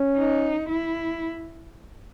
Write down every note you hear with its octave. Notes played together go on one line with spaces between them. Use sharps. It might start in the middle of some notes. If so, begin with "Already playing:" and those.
Already playing: C#4
D#4
E4